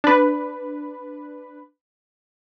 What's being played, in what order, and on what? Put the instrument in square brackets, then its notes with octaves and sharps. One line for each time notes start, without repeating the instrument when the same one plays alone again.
[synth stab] D4 B4